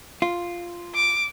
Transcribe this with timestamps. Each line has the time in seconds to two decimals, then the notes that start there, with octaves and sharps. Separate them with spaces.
0.22 F4
0.95 D6